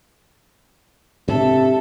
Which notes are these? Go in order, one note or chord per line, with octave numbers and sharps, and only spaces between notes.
G#2 C3 D4 A4 E5